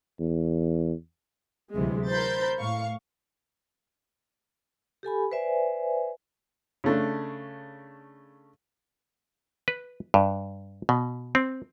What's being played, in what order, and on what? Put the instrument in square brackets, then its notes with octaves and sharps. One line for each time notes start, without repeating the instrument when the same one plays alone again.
[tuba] E2
[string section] D2 C3 E3 F#3 G#3
A#4 C5 B5 G6 A6
A2 F5 C#6
[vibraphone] G4 A4 G#5 B5
B4 C5 D5 E5 G#5
[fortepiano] C#3 A3 D4
[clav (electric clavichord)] B4
G2
B2
C4